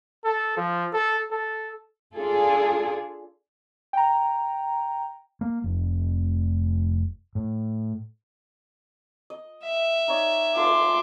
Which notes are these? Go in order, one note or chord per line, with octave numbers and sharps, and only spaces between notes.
A4
F3
A4
A4
D4 F4 G#4 A4
G5 A#5
A#3
F1
A2
D#5
E5
D#4 C#5 D5
F4 A4 C6 D6